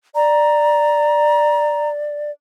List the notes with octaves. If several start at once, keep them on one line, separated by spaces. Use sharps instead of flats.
D5 A#5